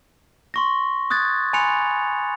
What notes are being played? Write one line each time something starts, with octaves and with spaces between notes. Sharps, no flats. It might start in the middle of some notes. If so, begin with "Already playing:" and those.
C6 C#6 A#6
D#6 F#6 G#6 A6
G#5 B5 C6 F#6 C#7 F7